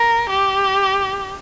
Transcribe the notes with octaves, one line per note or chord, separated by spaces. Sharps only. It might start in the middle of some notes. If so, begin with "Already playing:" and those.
Already playing: A#4
G4